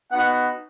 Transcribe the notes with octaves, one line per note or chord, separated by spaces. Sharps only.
B3 D#4 F#4 F#5